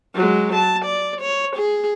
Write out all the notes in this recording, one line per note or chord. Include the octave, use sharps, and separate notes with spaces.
F#3 G#3
A5
D5
C#5
G#4